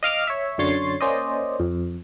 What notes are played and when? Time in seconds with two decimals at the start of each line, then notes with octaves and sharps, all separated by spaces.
0.03 D#5 F5 D6 F6
0.27 C#5 E5
0.58 F#2 D3 C#5 C6 A6 C7
1.01 A#3 C#4 C5 D5 D#5
1.60 F2